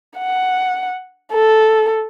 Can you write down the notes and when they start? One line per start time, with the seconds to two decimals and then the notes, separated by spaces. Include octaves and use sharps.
0.18 F#5
1.33 A4